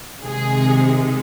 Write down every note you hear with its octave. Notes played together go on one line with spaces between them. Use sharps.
C3 D#3 G#3 G#4